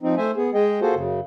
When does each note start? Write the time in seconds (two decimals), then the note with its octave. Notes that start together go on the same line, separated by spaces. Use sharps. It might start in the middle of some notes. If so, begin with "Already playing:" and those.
0.03 F3 C4 D#4
0.17 A3 C5 E5 G#5
0.36 B3 G#4
0.54 G#3 G#4 D#5 G5
0.81 A#3 F4 F#4 G#4 A4 C5
0.95 F#2 C#3